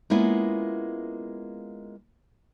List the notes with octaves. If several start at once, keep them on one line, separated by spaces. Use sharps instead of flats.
G#3 A#3 B3 C#4 E4 F4